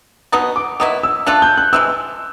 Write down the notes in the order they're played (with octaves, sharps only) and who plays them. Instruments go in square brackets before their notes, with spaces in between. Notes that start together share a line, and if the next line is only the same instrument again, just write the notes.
[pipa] B2 F#3 B3 D#4 [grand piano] D#6
[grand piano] D6
[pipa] D#3 F#3 B3 E4 [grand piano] D#6
[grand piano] E6
[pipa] A3 D4 F4 A4 [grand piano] F#6
[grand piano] G6
F#6
[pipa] C3 E3 G#3 [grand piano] E6